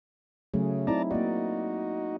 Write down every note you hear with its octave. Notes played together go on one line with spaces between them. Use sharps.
C#3 F#3 A3 G#4
C4 D#4 E4 D5 A5 A#5
A#3 D#4 F#4 D5